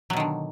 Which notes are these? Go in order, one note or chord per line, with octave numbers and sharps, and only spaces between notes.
B2 D3 D#3 F#3